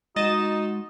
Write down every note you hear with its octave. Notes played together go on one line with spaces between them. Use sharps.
G#3 D#4 F#4 D#5 A6 E7